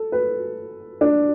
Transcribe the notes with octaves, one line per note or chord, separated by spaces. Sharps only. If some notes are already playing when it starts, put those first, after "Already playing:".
Already playing: A4
B4
D4